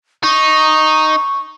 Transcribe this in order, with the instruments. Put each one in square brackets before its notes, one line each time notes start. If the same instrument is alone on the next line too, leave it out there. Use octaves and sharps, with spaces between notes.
[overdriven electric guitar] D#4 [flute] C#6